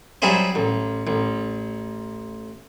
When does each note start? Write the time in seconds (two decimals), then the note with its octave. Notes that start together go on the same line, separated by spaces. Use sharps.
0.22 F#3 G3 C4 E4 G#4 C5
0.55 A1
1.07 A1